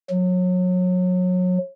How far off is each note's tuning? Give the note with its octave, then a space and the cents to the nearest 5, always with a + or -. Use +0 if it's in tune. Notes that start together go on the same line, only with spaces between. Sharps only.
F#3 -30